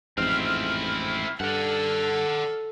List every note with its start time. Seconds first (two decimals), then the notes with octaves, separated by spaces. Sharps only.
0.18 A1 F2 G#2 C4 E4 F6
1.40 G2 A4 D5 F#5